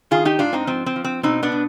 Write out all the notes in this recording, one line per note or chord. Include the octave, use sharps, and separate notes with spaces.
D#3 F4 G#4
D#4 G4
G#2 D4 F4
C4 D#4
F3 C4
C4
F3
C4
B2 C4 D#4
B3 D4
B2